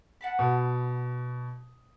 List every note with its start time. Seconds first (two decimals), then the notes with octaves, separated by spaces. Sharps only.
0.21 F#5 A5 B5
0.39 B2